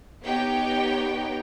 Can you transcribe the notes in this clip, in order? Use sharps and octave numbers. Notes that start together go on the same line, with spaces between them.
B3 D#4 G4 C#5 G5